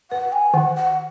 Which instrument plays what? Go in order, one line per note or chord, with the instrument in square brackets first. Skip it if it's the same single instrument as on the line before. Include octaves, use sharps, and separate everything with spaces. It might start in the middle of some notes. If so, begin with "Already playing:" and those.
[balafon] B4 [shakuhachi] F#5
[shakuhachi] G#5
[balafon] D#3 [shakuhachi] F#5
[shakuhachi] F#5